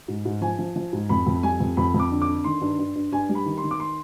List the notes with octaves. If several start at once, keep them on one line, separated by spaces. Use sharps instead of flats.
G#2
G#2
F3 G#5
F3
F3
G#2
F2 B5
F2
G3 G#5
F2
F2 B5
F2
D6
D3
D6
D3
D#3 C6
G2
G2
G2
G2 G#5
G3
B5
D#3
C6
D#3
D6
C6